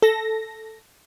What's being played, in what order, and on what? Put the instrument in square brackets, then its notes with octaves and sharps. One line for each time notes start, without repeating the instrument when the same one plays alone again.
[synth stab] A4 A#6